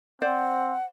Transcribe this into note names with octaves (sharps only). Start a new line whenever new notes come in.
C4 C5 D5 F#5